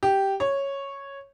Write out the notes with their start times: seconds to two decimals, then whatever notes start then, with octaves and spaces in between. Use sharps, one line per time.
0.03 G4
0.40 C#5